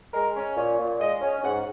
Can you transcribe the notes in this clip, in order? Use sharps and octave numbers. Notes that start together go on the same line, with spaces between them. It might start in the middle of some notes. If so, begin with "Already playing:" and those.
G#3 A#4
C#4
A#2 C#5
A#2
G#3 D#5
C#4
G#2 F#5